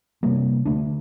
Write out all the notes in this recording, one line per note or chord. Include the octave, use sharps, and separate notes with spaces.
C3 G3 A#3
D3 A3 D4